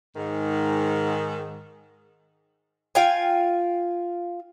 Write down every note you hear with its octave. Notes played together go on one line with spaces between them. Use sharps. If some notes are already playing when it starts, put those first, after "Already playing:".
G#2 D#3
F4 F5 G5 G#5